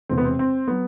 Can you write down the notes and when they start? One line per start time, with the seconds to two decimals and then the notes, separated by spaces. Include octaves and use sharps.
0.09 E1 E2 C3 C4
0.18 B3
0.24 C4
0.39 C4
0.68 F#3 B3